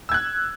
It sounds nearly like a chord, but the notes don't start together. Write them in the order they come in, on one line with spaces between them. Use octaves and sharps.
E6 G#6 F#6